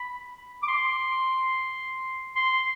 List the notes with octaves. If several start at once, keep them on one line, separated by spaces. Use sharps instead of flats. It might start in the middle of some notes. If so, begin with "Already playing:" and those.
Already playing: B5
D6
C6
C6